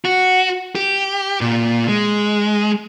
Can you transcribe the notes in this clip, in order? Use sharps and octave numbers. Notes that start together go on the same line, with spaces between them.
F#4
G4
A#2
G#3